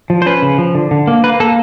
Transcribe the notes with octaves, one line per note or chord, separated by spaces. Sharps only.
F3
C5
C#4 B4
C#3
F3
D3
D3
A#3
A#3 B4
A#3 A4